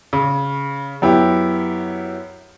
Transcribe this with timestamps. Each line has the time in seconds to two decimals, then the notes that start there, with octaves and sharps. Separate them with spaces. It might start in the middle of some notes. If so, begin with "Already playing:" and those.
0.13 C#3
1.02 F#2 B3 E4 G4